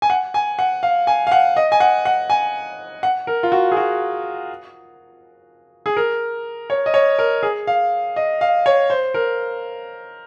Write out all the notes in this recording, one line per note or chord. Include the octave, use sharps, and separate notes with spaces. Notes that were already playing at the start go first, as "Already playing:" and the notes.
G#5
F#5
G#5
F#5
F5
G#5
F5
F#5
D#5
G#5
F#5
F#5
G#5
F#5
A#4
F4
F#4
G#4
F#4
G#4
A#4
C#5
D#5
C#5
A#4
G#4
F5
D#5
F5
C#5
C5
A#4